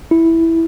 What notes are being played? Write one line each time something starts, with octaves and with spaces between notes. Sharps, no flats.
E4